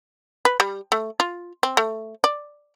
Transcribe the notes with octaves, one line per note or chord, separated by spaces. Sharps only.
B4
G3
A3
F4
C4
A3
D5